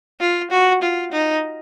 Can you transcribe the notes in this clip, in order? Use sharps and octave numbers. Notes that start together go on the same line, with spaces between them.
F4
F#4
F4
D#4